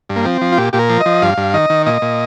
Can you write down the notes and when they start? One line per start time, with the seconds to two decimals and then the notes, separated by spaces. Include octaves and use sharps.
0.09 G2
0.16 A#3
0.25 F3 C4
0.41 F3
0.52 F4
0.58 A#2 G4
0.73 A#2 G4
0.79 A#4
0.89 F3
1.01 D#5
1.06 F3
1.22 G2 F5
1.38 G2
1.54 D#3 D#5
1.70 D#3
1.86 A#2 D#5
2.02 A#2